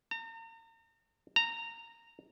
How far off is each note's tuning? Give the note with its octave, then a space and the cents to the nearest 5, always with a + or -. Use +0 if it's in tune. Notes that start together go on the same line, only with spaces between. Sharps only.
A#5 -40
A#5 -15